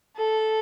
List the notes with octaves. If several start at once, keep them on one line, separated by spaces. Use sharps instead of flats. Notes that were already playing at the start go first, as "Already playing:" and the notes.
A4